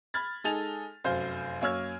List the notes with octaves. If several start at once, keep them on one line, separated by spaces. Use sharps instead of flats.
B5 F6 G#6 A6
G#3 D#4 A4 G#5 A6 F7
F1 F#2 C5 F5 G6
F#2 A#3 C#5 E6 F6 G#6